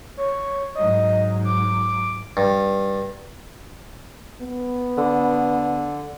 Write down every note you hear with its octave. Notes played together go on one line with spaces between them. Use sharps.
C#5
G#2 F#3 D#5
D6
G2
B3
D3